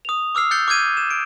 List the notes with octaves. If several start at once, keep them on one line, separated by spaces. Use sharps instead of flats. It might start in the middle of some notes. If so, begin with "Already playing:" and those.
D#6 F7
D6 E6 F6 C7
F#6 G6 A6 C7 C#7 G7
D6 F6 G6 G#6 D#7
E7
D7